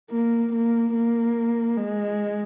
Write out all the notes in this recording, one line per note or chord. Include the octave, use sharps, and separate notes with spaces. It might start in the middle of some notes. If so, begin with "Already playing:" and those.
A#3
A#3
A#3
G#3